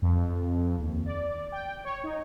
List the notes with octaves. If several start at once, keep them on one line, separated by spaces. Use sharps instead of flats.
F2
D#2
D5
G5
C#5
D#4